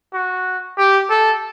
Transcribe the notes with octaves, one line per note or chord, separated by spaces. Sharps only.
F#4
G4
A4